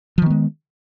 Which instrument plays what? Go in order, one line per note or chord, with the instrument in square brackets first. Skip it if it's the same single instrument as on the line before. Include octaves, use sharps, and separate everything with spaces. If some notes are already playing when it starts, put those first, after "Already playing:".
[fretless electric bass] F3
D#3
B3
G#3